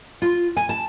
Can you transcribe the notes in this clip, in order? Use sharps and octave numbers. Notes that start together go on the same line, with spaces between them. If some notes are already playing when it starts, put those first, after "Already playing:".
F4
G#5
A5